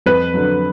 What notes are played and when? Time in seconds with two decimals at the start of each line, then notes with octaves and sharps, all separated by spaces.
0.06 F2 B4
0.34 D3 F#3